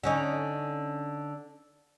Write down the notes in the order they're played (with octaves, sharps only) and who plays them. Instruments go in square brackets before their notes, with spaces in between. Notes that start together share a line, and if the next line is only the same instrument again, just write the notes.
[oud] D3 C#4 D#4